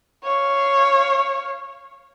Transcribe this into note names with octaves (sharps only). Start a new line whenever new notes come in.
C#5 F5